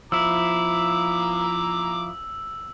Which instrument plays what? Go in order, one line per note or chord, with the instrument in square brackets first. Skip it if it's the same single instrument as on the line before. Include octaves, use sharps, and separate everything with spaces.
[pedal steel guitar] F3 E4 [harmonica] A#5 D6 [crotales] E6